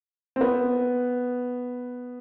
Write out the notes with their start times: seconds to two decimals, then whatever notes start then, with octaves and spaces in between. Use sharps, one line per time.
0.36 C4
0.41 B3